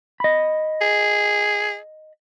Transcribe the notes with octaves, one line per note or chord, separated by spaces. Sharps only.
D#5 B5
G#4